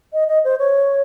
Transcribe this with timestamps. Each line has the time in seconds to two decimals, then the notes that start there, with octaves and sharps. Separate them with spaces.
0.13 D#5
0.28 D#5
0.44 C5
0.59 C#5